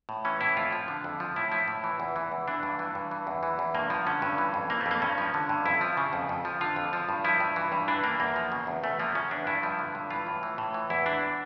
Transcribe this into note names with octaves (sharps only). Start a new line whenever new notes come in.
A2
E3 C#4
A2 E4
F2 F4
F3
D3
F2
F3
A2 E4
F3 E4
A2
E3
E2
E3
E2
E3 D4
G2
E3
G2
E3
E2
E3
E2
G2 A#3
F3
D3 C#4
G2
E3
F2
E3 A#3
A3
F2
A#3
G2 C#4
F3
D3
G2
F2 E4
F3
C#3
F2
F2
F3
D3 F4
F2
F3
G2
F3 E4
G2
E3
G2
E3 D4
G2 A#3
E2 A#3
F3
C#3
E2
E2 A3
F3 A#3
C#3 C#4
E2 D4
G2 E4
F3
D3
G2
E3 F4
A2
E3
A2
E3
E2 E4
E3 D4